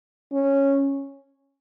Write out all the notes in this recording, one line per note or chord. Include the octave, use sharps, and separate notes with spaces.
C#4